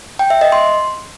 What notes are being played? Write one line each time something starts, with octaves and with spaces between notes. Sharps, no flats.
G5
E5
D#5
C6